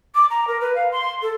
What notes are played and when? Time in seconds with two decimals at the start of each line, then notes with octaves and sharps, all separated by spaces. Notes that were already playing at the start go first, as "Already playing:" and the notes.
0.15 D6
0.30 A#5
0.48 A#4
0.61 B4
0.75 F5
0.92 C6
1.22 A4